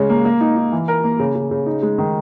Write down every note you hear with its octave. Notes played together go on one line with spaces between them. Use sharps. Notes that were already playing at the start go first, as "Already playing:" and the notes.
Already playing: C#3 G#3 C#4
A#3
A#3
D#4
D#4
E3
A#4
A#3
C#3
C#3
C#3
D#4
G#3
D#3